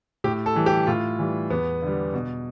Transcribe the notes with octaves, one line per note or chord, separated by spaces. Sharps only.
A2 G4
A4
E3 G3
G4
A2 F4
E3 G3
E2 B3
D3 G3
B2